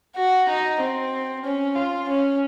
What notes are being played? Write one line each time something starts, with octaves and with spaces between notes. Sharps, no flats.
F#4
D#4
C4
C#4
F4
C#4